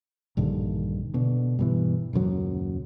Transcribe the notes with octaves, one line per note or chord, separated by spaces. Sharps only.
A#1 G2 D3 D#3
B2 D3
G2 B2 E3
D#1 C#2 F#2 F#3